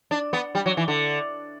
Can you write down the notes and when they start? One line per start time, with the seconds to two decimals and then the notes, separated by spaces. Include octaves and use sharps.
0.11 D4
0.33 B3
0.55 G3
0.66 F#3
0.77 E3
0.88 D3